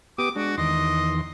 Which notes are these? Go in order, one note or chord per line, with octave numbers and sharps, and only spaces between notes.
B3 G4 D6 D#6
G#3 D4 F#4
E2 D#3 D#5 C6